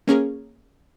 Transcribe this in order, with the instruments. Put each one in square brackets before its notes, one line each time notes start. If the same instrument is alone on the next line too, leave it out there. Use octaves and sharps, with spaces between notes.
[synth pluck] A#3 C#4 G#4 A#4